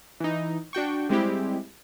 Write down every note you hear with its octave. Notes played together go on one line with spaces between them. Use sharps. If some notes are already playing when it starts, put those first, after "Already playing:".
E3 D#4
D4 F#4 G5 C#6
G3 G#3 C4 E4 G4